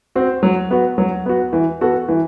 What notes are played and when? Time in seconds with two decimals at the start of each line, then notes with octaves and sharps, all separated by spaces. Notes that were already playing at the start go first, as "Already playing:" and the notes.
0.15 C4 F#4
0.43 F#3
0.71 B3 F#4
0.98 F#3
1.26 B3 F#4
1.53 E3
1.81 B3 F#4 A4
2.08 E3